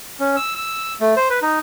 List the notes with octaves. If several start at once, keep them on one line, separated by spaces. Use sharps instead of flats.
C#4
E6
E6
A3
C5
B4
D#4